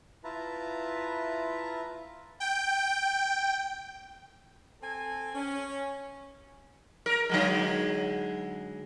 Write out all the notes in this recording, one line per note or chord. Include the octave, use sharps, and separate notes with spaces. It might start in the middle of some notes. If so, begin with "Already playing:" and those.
E4 F4 B4 E5 A5 A#5
G5
C4 A4 G#5
C#4
A#4
D3 F#3 G#3